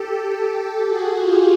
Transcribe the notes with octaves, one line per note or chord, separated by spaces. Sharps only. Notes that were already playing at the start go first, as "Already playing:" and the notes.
Already playing: G4 A4
F#4 G#4
F4 G4